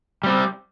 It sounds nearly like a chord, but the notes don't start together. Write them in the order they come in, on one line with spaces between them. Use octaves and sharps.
G3 C4 G4